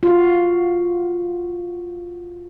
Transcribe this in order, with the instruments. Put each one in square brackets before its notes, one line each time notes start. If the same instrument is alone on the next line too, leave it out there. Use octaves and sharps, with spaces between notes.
[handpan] F4 F#4